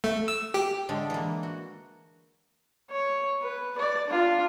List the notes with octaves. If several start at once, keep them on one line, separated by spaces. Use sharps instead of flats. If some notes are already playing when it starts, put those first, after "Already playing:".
A3
E6
G4
D3 G#3 A3
E3 A#3
F#4
C#5
B4
D5
D4 F4